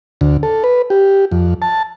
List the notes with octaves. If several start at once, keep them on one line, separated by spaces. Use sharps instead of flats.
D2
A4
B4
G4
F2
A5